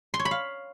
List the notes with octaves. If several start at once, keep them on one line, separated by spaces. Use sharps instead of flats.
C6
C#5
B5
F5